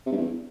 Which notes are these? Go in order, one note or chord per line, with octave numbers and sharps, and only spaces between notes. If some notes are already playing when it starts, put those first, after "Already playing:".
C3
G2
E2